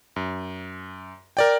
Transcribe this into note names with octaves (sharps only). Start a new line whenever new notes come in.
F#2
A#4 D5 G5